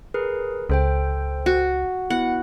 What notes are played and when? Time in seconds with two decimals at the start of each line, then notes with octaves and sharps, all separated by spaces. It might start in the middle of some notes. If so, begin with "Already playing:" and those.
0.14 G#4 A#4 B4
0.69 C#2 A4 C5 G5
1.46 F#4
2.10 B3 E4 F#5